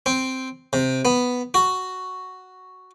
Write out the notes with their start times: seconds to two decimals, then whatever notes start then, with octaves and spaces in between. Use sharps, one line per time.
0.06 C4
0.73 C3
1.05 B3
1.54 F#4